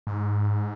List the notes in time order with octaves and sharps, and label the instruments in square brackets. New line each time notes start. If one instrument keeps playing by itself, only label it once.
[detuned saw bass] G#2